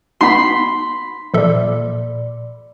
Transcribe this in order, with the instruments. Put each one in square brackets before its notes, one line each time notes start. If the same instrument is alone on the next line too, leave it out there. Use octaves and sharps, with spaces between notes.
[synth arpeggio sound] B3 D#4 F#4 [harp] B5 C6
[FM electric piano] A#2 D5 [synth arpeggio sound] F3 A4 E5